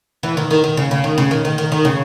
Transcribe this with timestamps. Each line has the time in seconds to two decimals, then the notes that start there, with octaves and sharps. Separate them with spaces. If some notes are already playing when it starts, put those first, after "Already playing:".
0.23 E3
0.37 D#3
0.51 D#3
0.64 D#3
0.77 C#3
0.91 C#3
1.04 D#3
1.18 C#3
1.31 D#3
1.45 D#3
1.58 D#3
1.72 D#3
1.85 C#3